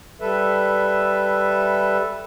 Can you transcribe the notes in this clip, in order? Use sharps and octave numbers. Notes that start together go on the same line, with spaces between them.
G3 A4 B4 E5